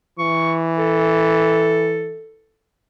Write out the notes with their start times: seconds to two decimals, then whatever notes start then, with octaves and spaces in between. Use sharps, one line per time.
0.19 E3 C#6
0.78 A4